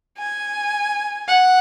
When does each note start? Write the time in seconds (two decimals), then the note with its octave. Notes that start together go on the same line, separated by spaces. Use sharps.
0.18 G#5
1.28 F#5